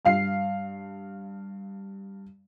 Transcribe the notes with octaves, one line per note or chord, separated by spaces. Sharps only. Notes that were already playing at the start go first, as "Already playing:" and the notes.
G2 F5 C7